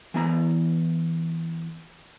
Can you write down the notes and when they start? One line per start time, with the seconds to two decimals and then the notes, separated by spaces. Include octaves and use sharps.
0.14 E3 B3 A#5